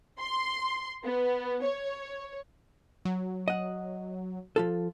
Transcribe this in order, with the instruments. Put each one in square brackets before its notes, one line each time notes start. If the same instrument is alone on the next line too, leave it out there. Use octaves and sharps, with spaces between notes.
[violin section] C6
B3
C#5
[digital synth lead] F#3
[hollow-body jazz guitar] D#5 F#5
F3 F4 A4